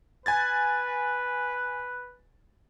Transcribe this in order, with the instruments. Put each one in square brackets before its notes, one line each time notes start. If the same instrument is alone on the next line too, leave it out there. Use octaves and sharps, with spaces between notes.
[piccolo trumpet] B4 [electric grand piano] G#5 G#6 A6